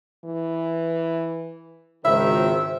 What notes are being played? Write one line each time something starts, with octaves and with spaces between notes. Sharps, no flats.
E3
G#1 C#2 D#3 C5 E5